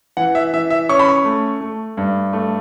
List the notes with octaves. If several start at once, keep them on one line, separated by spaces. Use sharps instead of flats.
E3 F#5
E5
E3 E5
E5
C#4 C#6
B5
C#6
A3
A3
G2
A3